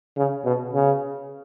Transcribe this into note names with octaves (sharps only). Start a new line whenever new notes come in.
C#3
B2
C#3